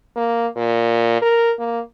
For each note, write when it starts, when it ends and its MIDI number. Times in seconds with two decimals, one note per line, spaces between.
0.16 0.47 58
0.56 1.19 46
1.22 1.53 70
1.59 1.80 58